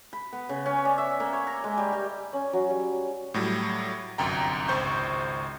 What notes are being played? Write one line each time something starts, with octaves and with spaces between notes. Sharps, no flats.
B5
B3
C#3
C#4
D5
E5
A#3
C#5
A#5
G#3
G3
G4
C#4
F#3
G3
A2 F#3 G3
G1 C2 F#2 G5 A#5
G#1 C#2 C5 C#6 G6